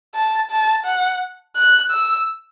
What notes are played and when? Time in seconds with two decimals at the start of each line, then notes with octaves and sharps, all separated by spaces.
0.15 A5
0.50 A5
0.85 F#5
1.56 F#6
1.91 E6